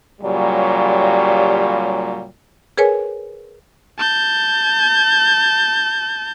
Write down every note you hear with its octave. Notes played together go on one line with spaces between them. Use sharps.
A#2 C#3 F#3 G3
G#4 A#4 B4 C#5 G#5
A5 G6